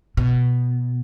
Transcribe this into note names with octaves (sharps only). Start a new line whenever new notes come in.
B2